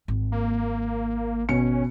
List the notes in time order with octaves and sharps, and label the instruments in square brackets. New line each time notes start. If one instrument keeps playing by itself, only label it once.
[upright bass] G#1
[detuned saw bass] A#3
[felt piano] B2 C#7 [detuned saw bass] C#4